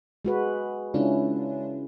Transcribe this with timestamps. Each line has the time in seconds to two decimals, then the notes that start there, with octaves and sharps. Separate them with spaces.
0.25 G#3 F#4 B4
0.94 C#3 G#3 C#4 D4 E4 F4